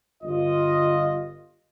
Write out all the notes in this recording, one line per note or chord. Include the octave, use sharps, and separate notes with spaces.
G1 F4 D#5